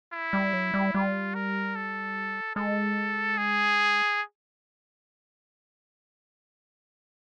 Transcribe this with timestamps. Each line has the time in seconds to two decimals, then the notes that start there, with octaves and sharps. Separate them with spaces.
0.13 E4
0.33 G3
0.53 F#3
0.74 G3
0.95 G3 F4
1.35 A#4
1.76 A4
2.56 G#3 A4
3.38 G#4